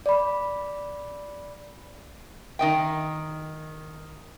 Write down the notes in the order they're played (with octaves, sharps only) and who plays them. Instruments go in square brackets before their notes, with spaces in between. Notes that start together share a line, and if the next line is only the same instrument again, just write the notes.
[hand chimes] D5 B5
[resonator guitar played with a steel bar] D#3 D#5 G5